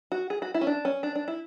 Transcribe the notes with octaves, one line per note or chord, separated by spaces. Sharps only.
F#4
G#4
F#4
E4
C#4
D4
C#4
D4
D4
E4